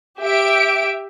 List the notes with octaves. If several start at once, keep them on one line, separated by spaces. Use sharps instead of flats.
G4 E5 D7